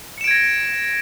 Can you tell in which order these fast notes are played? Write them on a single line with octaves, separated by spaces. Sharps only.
C#7 E7 D7 G#6 A#6